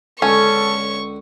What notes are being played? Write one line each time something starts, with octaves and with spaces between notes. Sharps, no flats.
C#2 D3 C#4 A4 C#6